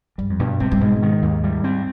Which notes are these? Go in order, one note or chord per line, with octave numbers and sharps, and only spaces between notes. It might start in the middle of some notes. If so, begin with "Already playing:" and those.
G2 G3
F2
G2 B2
G2 C4
G2
G#2 B2
D#3
D#2
G3
C4